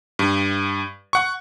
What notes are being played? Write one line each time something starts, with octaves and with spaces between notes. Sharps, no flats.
G2
F#5 C#6